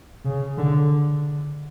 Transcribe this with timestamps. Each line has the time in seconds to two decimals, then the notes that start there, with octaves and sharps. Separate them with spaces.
0.25 C#3
0.58 D3